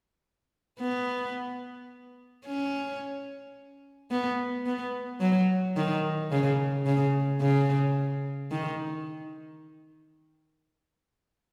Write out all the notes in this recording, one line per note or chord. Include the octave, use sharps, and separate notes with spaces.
B3
C#4
B3
B3
F#3
D#3
C#3
C#3
C#3
D#3